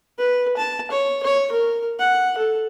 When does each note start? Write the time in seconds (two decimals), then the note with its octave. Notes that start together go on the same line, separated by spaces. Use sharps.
0.18 B4
0.57 A5
0.91 C#5
1.23 C#5
1.52 A#4
1.99 F#5
2.38 A4